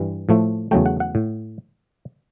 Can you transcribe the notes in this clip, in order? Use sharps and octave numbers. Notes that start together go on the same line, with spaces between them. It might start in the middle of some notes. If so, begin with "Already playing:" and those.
Already playing: G2 E3 G3
A2 F3 A3
E2 C#3 F#3 A3 G5
F#5
F#5
A2